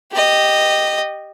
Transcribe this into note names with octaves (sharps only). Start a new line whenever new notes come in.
G4 D#5